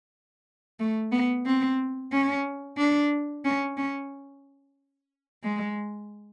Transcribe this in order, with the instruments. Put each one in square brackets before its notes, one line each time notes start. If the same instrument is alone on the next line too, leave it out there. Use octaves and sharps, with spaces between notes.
[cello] A3
B3
C4
C#4
D4
C#4
C#4
G#3